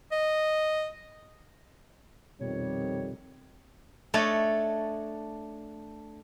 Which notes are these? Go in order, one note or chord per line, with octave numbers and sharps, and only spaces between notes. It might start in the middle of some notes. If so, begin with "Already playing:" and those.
D#5
F2 B2 D#3 G3 C4 C#5
A3 D4 C#5 D#5 A5